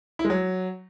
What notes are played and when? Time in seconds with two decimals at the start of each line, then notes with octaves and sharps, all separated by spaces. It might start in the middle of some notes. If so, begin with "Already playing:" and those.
0.19 E4
0.25 G#3
0.30 F#3